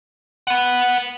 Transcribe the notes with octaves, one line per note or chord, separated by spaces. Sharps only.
B4 F#5